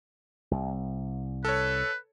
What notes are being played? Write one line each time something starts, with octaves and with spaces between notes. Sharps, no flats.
C2
A4 B4 C#5